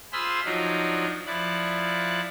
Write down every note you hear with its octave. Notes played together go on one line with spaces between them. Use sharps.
F4 G#4 C5 B5 C6 E6
F3 F#3 D4 D#4
F3 E4 D5 F#6